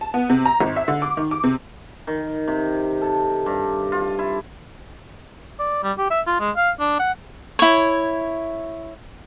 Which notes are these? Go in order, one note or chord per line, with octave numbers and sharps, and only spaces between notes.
A5
B3
C3
A#5
G#1
E5
D3
D6
D#3
D6
C3
D#3
C3
A4
G2
F4
E4
D5
G3
G4
E5
F4
G#3
F5
D4
F#5
E4 C#5